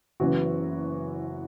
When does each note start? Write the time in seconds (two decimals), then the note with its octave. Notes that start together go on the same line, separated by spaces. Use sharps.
0.20 F#1 F#2 E3 B3 F#4